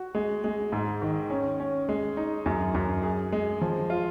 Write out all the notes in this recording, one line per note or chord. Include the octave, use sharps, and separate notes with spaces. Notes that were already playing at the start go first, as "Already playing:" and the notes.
Already playing: F#4
G#3
G#3
G#2
D#3
C#4
C#4
G#3
D#4
F#2
F#2
G#4
G#3
F3
F4